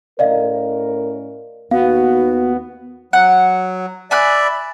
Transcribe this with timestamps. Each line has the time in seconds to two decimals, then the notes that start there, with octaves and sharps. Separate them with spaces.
0.19 A2 C#4 A#4 D5 D#5 F5
1.71 D#2 B3 F#4 F5
3.13 F#3 F#5
4.11 D5 E5 G#5 B5 F#6